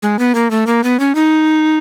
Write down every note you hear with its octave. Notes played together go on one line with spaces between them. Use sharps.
G#3
B3
A#3
A3
A#3
B3
C#4
D#4